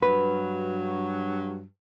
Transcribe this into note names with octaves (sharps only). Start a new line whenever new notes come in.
G2 F#3 B4